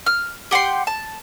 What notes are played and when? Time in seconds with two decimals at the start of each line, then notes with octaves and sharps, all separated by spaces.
0.06 F6
0.51 G4 F#5 G5 C6
0.87 A5